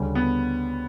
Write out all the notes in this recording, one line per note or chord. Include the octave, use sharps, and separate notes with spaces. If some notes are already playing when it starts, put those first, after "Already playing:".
Already playing: D2 C#3 G3 C#4
B3